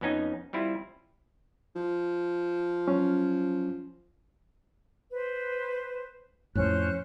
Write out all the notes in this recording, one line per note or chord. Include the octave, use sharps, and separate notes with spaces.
F2 B3 C#4 D#4 G#5
G3 C4 E4 F4
F3
F#3 C#4
B4 C5
F2 A2 C#4 C5 F#6